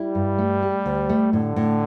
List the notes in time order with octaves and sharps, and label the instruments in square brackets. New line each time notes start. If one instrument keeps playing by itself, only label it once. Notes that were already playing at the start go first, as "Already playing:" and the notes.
Already playing: [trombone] G3 [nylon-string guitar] E4
[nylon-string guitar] G2
A3
G4
D2
A3
[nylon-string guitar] A2 [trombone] D3
[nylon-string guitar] A2